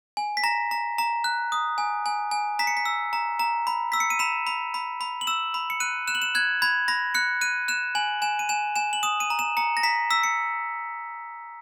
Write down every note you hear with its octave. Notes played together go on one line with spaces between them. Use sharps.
G#5
B6
A#5 A#6
A#5
A#5
F#6
D#6
G#5
G#5
G#5
A#5 B6
C#7
B6
E6
A#5
A#5
B5
E6 B6
C#7
D#7
B5 E7
B5
B5
B5
F#7
E6 E7
B5
C#7
F#6 D#7
F#6 E7
F#7
E7
F#6 G#6
B5 G#6
B5 A#6
F#6 C#7
F#6 D#7
F#6 E7
G#5 F#7
G#5 E7
D#7
G#5 E7
G#5 E7
F#7
D#6 E7
D#7
A#5
E7
A#5 C#7
A#6
A#5 B6
E6 B6
C#7